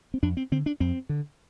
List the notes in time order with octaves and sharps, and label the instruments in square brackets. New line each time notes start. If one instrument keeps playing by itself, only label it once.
[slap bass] C4
F2 D4
C4
D3 C4
D4
F2 C4
D3